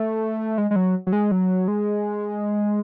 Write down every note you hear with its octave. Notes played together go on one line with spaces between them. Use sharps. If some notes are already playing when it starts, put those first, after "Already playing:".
Already playing: A3
G#3
G#3
F#3
F#3
G#3
F#3
G#3